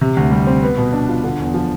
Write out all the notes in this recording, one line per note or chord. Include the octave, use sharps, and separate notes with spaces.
C3
D2
G3
C4
B3
B2
D4
F4
D3
E2
F3